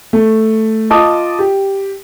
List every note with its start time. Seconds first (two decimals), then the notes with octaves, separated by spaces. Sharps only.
0.13 A3
0.90 F4 D#5 A5 D6 D#6
1.39 G4